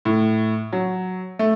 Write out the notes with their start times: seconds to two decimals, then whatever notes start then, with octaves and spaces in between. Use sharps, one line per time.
0.05 A2
0.72 F#3
1.39 A3